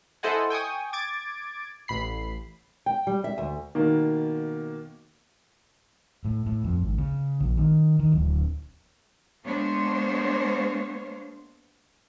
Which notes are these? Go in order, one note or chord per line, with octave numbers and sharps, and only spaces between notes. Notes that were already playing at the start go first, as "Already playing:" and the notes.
E4 A4 C5 D#5 F#5 G#5
G5 G#5 C#6 D#6
D6 G#6 A6 D7
A1 B5 C7
G5
G3
E5
D2
B2 D#3 A#3
A2
A2
F2
G#1
C#3
A#1
D#3
D#3
D1
G#3 A#3 B3 D4 C5 C#5